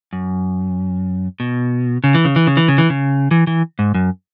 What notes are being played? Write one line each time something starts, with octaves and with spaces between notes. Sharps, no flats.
F#2
B2
C#3
E3
C#3
E3
C#3
E3
C#3
E3
C#3
E3
E3
G#2
F#2